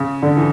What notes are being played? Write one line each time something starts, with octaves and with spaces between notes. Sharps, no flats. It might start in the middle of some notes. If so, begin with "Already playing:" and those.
Already playing: C#3
D3
E3